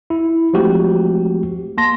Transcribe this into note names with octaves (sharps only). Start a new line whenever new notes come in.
E4
F3 G#3 A3 C4 F#4 G4
A#3 A5 C6 A#6